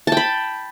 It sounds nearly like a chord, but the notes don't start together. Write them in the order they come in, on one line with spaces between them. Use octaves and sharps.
A5 G5 B5